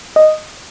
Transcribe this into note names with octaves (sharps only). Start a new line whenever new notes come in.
D#5